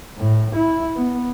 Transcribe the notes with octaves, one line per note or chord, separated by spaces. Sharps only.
A2
E4
B3